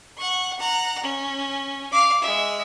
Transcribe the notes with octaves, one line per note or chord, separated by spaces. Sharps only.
F#5 C#6
F#5 A#5
C#4
F5 D6
G#3 E5